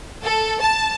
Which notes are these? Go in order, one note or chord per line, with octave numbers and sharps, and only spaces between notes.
A4
A5